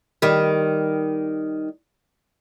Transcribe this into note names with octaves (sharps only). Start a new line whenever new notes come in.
D#3 G3